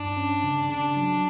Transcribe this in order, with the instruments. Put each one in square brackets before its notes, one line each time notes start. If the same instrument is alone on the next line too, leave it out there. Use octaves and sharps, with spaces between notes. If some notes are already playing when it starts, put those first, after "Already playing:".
Already playing: [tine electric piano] G2 [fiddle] D4
[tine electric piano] C#4
C#3
[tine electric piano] C#3 [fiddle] D4
[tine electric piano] F#3